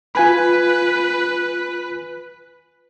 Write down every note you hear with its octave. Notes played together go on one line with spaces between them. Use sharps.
F4 B4 G#5 B5